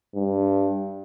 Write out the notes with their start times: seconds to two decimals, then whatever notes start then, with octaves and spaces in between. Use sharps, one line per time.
0.15 G2